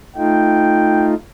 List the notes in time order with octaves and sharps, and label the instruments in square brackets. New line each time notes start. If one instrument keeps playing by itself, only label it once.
[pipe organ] A3 D#4 F4 [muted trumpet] G5